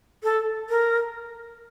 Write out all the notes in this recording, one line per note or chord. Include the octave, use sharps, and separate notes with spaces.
A4
A#4